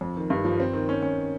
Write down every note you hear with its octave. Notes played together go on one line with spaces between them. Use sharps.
F2
D#3
G2
F3
C4
D#3
C#4
C#4